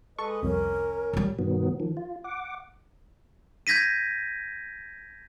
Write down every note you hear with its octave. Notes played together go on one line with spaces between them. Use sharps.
G#3 A4 B4 D#5 C#6
C2 F2 C#4 A#4
A#2 G3
G2 B2 D#3 F#3 B3
D#3 F3
F4
F#5 D6
G6 G#6 A#6 B6 D#7